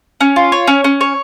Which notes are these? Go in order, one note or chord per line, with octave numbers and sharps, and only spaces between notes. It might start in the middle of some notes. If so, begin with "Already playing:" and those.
C#4
F4
C#5
C#4
C#4
C#5